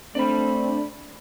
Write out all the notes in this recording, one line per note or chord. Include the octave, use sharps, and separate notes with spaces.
A3 C4 D4 D5 B5